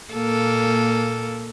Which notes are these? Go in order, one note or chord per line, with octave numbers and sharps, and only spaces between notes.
A#2 A#3 A4